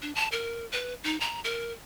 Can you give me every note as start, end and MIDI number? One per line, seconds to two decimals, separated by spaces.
0.02 0.14 62
0.15 0.28 81
0.32 0.66 70
0.72 0.94 71
1.04 1.19 63
1.20 1.41 82
1.44 1.72 70